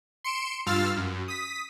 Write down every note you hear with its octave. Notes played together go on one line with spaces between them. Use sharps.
C6 C#7 D7 E7
G2 F4 F5 E6 F6 A6
F#2
D#6 B6